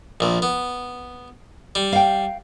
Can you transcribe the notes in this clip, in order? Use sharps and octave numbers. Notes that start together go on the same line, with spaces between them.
A#1 A#2
B3
G3
F5 G5